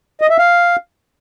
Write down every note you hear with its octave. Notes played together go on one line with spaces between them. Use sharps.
D#5
E5
F5